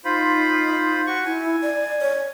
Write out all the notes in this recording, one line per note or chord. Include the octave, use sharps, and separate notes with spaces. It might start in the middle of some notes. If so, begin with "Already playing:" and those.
D#4 F4 C5 B5
F#4 C#6
E4 G#5
D5
C#5